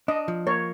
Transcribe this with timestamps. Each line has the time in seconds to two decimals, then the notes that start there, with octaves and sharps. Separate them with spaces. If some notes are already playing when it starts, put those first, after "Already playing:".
0.08 D4 D#5
0.28 F3
0.47 A#3 C#5